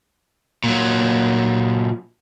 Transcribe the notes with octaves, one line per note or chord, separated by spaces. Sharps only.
A#2 F#3